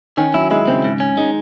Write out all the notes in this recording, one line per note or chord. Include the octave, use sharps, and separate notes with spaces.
D#3 C#4
F#3 E4
G#3 E4
C#3 C4
G#2
C#4
G#3 D#4